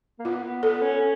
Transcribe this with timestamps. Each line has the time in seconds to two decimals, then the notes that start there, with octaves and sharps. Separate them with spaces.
0.19 A#3
0.25 B3 F4
0.44 B3
0.63 B3 A4
0.82 C#4
1.00 C#4